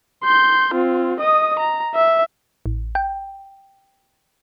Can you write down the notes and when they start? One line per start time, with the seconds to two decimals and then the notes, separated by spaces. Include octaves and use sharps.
0.23 C6 G6
0.74 C4 F4
1.20 D#5 D#6
1.59 A#5
1.95 E5
2.66 A1
2.95 G5